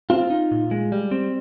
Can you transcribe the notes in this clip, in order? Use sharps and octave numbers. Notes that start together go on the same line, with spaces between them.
C4 F4 F5
D#4
A#2
G#3
G3
C4